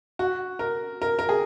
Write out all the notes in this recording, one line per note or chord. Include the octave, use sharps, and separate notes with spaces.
F#4
A#4
A#4
A#4
G#4